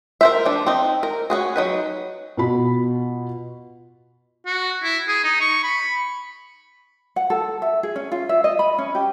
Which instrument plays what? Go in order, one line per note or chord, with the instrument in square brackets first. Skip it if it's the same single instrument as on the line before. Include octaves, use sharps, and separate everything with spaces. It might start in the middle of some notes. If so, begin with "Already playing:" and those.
[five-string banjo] A#4 C5 E5
F3 D4
C4 D#4
A#4
C#4 F#4 G#4
F#3 D#4 B4
[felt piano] B2 F4 B5
[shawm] F#4
E4
G#4
D#4
C#6
B5
[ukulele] F#5
A4
E5
G#4
C#4
F4
E5
D#5
B5
C#4
G4